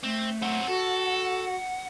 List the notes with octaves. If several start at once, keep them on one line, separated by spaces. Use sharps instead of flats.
A3 C4
F#3 C4 F#5
F#4 A4